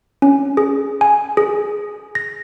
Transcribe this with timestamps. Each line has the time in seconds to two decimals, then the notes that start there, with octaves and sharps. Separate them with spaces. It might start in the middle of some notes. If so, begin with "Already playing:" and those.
0.22 C#4
0.57 G#4
1.01 G#5
1.37 G#4
2.15 A#6